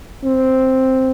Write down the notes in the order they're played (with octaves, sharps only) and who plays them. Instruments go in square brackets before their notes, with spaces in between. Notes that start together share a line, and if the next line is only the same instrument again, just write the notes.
[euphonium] C4